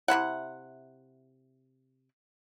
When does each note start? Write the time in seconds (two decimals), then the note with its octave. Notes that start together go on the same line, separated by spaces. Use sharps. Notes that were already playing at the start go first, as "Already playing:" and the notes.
0.08 C3 B3 E4 F#5